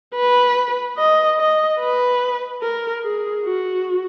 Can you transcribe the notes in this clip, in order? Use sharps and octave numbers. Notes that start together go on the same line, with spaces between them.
B4
D#5
D#5
B4
A#4
G#4
F#4